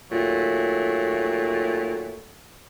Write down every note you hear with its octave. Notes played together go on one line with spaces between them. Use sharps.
D#2 A#2 F#3 A3